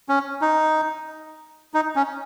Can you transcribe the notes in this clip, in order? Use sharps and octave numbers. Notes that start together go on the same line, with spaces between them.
C#4
D#4
D#4
C#4